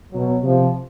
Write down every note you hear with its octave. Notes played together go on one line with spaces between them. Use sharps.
B2 F#3
C3 F3